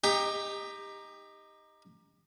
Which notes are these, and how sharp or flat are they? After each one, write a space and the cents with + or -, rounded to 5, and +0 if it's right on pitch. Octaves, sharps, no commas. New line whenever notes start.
D#4 +0 G4 +25 G5 +5